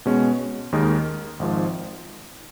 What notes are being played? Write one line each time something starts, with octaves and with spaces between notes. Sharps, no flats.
B2 G#3 C#4
D#2 D#3 G#3 D#4 A#4
G#1 G#2 F3